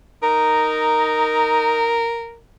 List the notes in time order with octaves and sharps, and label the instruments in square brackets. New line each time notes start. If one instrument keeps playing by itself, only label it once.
[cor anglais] D#4 [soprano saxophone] A#4